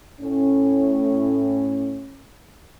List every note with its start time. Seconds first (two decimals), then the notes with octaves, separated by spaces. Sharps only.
0.21 A2 C#4